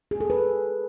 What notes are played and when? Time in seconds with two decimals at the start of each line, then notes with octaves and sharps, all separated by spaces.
0.11 G#4
0.20 A4
0.30 B4